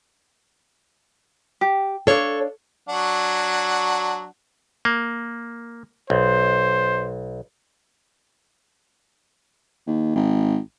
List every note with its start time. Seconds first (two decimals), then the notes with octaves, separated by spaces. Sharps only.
1.61 G4
2.07 D4 A4 C#5 F5
2.89 F#3 D4 F#5
4.85 A#3
6.10 B1 C5
9.87 D#2
10.15 G#1